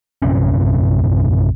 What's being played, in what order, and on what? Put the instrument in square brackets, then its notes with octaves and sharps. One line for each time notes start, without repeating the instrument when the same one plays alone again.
[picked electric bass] A#1 F#2 C3 C#4